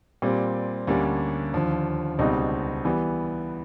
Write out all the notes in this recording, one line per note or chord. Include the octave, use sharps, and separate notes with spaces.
A#2 G3 C4
D2 D3 G3 A#3 C#4
D#2 D3 F3
C#2 B2 G3 C4 D#4
E3 G3 B3